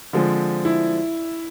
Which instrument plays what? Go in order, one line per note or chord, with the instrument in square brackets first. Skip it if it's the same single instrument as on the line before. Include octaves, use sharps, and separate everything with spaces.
[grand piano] D3 F3 G#3 C4
[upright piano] E4